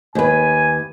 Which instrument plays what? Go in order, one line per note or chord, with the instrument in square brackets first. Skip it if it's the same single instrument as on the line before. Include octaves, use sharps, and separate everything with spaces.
[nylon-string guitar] D#2 B4 [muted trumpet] G#5